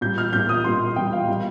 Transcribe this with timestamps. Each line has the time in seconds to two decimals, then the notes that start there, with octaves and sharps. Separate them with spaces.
0.01 A#2 G3 G6
0.18 F6
0.33 A#2 G3 G6
0.49 D#6
0.64 A#2 G3 C6
0.96 A#2 G3 G5
1.13 F5
1.28 A#2 G3